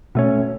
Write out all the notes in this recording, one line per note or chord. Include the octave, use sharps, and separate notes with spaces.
B2 A3 C#4